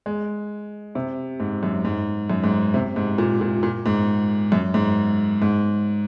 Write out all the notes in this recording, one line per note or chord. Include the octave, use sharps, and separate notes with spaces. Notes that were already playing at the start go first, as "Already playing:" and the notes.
G#3
C3
G#2
F#2
G#2
F#2
G#2
C3
G#2
A#2
A#2
A#2
G#2
F#2
G#2
G#2